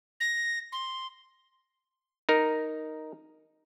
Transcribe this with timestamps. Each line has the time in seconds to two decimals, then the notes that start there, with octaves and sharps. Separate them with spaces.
0.20 A#6
0.72 C6
2.29 D#4 A#4